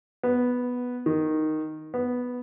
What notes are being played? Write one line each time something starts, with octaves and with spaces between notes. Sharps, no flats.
B3
D#3
B3